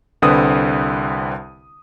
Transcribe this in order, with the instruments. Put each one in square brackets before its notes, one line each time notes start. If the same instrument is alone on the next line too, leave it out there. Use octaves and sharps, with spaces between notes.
[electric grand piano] C2 D3 C4 B4 D#6